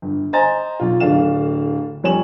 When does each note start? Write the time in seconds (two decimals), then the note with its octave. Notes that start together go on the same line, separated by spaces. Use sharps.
0.02 G1
0.33 C5 D#5 G#5 A#5 A6
0.79 B1 F4
1.00 D1 D3 D4 F5 E7
2.04 F2 G3 C#5 G#5 E7 F#7